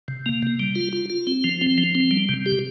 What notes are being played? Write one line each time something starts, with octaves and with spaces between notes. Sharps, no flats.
C3
A#3
C3
G3
F4
F4
F4
C4
F3
C4
F3
C4
G3
C3
G4